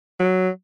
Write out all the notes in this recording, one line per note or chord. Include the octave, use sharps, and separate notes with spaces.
F#3